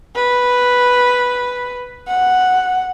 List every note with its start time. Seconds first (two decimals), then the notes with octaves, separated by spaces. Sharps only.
0.15 B4
2.07 F#5